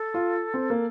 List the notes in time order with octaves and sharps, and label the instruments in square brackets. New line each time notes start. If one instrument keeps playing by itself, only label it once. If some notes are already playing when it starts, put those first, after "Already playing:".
Already playing: [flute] A4
[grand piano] F4
C4
A#3